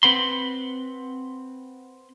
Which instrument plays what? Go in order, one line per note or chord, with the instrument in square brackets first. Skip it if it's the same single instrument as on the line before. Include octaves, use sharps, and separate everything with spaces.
[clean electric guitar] C4 B4 F#5 B5 C6